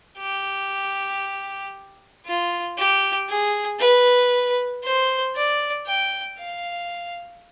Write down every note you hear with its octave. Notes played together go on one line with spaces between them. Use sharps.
G4
F4
G4
G#4
B4
C5
D5
G5
F5